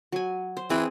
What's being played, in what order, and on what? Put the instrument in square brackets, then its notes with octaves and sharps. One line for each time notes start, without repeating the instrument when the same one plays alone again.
[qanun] F#3 G#5
C5
[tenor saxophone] E3 [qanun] C4 G#4